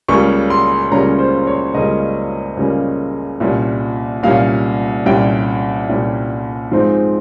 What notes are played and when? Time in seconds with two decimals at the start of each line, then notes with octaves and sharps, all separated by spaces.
0.08 C#2 C#3 G3 A#3 C#4 C#6
0.50 C6
0.91 C#2 C#3 G3 A#3 C#4 A#5
1.19 C5
1.47 C#5
1.74 C#2 C#3 G3 A#3 C#4 D#5
2.57 C#2 C#3 G3 A#3 C#4
3.40 C2 A#2 G3 C#4
4.23 C2 A#2 G3 C#4 F5
5.06 C2 A#2 G3 C#4 G5
5.89 C2 A#2 G3 C#4
6.71 G#2 F3 G#3 C4 D#4